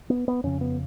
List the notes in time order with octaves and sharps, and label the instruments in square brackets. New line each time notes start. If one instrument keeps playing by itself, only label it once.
[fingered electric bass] B3
B3
F2 C#3 C#4
B3